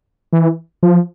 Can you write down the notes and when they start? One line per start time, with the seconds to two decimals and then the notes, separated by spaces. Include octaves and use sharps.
0.33 E3
0.83 F3